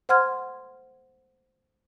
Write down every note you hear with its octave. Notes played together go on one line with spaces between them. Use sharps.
C5 F#5 C6 F6 G#6